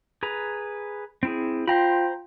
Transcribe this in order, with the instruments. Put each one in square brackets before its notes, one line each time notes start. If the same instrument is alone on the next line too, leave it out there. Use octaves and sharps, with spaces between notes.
[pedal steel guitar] G#4 B4 A#5
C4 E4 G#4
[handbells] F4 G5 [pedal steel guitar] C5 A#5 B5